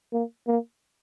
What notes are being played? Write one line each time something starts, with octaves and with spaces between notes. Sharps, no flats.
A#3
A#3